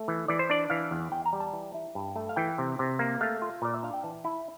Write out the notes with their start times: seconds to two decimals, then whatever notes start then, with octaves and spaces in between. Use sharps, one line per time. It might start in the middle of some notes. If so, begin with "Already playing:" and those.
Already playing: A3
0.08 E3
0.28 E3 D5
0.39 C5
0.50 D4 D5
0.70 E3 F5
0.91 E2
1.12 E2 G5
1.26 A#5
1.33 G3
1.40 A5
1.53 E3
1.74 E4
1.95 G2
2.16 A3
2.29 F5
2.36 E3 G5
2.58 C3
2.79 C3
2.99 A#3
3.21 A3 F5
3.42 F4
3.62 A#2 D5
3.74 E5
3.83 D4 F5
3.93 G5
4.03 E3 A5
4.24 E4